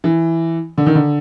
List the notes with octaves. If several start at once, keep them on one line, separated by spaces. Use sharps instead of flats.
E3
D3
D#3
D3